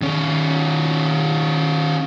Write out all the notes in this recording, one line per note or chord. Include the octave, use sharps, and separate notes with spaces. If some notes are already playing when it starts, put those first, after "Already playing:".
D#3 C#4